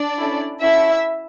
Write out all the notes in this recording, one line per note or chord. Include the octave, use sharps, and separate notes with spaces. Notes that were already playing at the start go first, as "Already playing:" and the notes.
Already playing: D4 D5
C#4 E4 A4
C#4 E4 F#4 A4 E5